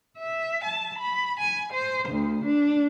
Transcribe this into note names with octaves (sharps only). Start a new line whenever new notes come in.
E5
A5
B5
G#5
C5
D2
D4